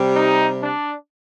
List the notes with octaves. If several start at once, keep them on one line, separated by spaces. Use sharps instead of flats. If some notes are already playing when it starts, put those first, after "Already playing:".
Already playing: C3 G3
D#4
D4